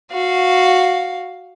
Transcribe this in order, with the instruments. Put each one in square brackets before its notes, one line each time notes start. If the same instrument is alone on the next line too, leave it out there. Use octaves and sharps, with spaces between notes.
[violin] F#4 F5